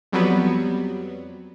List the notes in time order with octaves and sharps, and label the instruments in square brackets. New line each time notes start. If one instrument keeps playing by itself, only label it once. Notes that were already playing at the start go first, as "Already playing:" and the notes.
[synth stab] F2 F#3 G3 B3